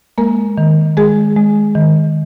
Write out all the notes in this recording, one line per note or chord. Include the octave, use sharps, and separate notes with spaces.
G#3 A#3 A#4
D#3
G#3 G#4
G#3
D#3